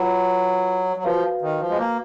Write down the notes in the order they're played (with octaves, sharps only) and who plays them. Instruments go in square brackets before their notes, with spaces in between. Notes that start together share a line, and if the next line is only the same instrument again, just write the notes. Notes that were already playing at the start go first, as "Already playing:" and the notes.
Already playing: [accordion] F#3 [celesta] F4 B4 F#5 B5
[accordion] F#3
[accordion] F3 [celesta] F#4 B4 F5
[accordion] D#3
F3
G#3
A#3